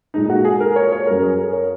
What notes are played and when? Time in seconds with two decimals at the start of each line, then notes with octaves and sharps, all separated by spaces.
0.14 A#2 G#3 D#4
0.30 F#4
0.45 G#4
0.60 A#4
0.76 C#5
0.92 C#5
1.07 F#2 F#3 A#4
1.23 G#4
1.39 A#4
1.53 C#5